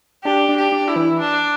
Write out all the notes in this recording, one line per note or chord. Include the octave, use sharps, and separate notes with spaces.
D4 G4
D4
G4
D4
E4
E3
D4